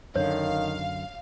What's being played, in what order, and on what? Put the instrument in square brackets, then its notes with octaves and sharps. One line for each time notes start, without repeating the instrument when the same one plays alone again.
[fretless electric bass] F#2 D3 [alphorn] D#3 [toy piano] C#5 [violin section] F5